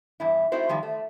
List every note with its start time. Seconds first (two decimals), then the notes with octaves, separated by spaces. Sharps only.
0.20 E2 G2 E4
0.52 A3 C4 D#4 E4 F#4 C5
0.69 D#3 F3 G3
0.83 A3